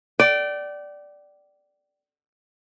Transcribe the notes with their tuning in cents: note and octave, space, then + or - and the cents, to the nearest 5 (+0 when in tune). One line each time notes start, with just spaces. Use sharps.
D5 +0 G5 -35